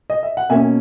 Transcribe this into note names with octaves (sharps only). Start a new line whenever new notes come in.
D#5
E5
F#5
B2 A#3 C#4 E5 G#5